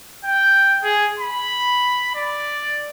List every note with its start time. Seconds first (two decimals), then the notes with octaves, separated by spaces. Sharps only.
0.25 G5
0.84 G#4
1.20 B5
2.15 D5